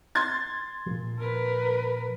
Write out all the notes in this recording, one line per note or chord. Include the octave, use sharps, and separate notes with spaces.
C6 G#6 A6
A#2 F3
A#4 B4